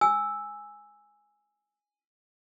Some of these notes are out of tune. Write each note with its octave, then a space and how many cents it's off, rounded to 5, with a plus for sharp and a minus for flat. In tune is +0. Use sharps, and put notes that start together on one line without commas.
G#5 +0 E6 +0